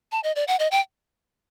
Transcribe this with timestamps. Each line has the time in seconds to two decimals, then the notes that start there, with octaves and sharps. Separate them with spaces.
0.12 A5
0.24 D#5
0.36 D5
0.48 F#5
0.59 D#5
0.71 G5